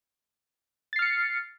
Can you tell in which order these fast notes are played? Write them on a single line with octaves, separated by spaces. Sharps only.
A6 C7 F6 C#7